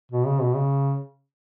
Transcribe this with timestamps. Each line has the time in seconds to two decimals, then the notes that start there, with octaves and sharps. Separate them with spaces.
0.12 B2
0.27 C#3
0.42 B2
0.56 C#3